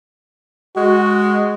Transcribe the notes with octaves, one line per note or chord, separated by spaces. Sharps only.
G#3 F#4